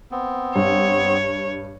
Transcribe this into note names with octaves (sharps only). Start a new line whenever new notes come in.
B3 C4
G2 C#5